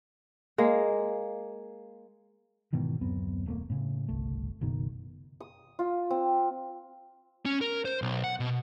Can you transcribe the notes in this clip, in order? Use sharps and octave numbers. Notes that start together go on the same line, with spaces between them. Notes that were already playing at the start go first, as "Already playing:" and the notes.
G#3 A#3
G#2 B2 D#3 E3
D1 F#2 B3 C4
D#1 A3 A#3
A2 C#3
G1 C2 A3
F#1 B2 D#3
D#6
F4
C4
C#4
A#4
C5
B1
F#5
B2